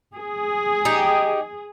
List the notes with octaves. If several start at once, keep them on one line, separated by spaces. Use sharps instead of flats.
G#4
D#4 G4